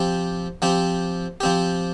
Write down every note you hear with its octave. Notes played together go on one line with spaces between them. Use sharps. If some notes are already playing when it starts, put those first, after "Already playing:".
Already playing: F3 C4 G4
F3 C4 G4
F3 C4 G4